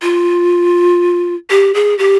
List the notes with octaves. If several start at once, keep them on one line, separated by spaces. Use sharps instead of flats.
F4
G4
G#4
G4